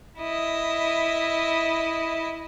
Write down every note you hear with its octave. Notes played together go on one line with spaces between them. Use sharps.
E4 D#5